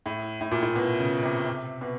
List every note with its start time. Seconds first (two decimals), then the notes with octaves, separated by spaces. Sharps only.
0.06 A2
0.41 A2
0.51 A#2
0.62 A2
0.76 B2
0.99 C#3
1.23 C3
1.46 C3
1.81 B2